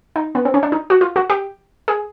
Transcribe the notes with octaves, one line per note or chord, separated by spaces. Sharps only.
D#4
B3
C4
C#4
D4
D#4
F#4
F4
F#4
G4
G#4